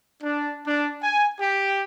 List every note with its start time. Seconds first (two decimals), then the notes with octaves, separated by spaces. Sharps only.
0.21 D4
0.66 D4
1.01 G#5
1.39 G4